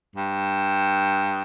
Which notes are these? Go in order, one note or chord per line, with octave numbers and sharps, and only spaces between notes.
G2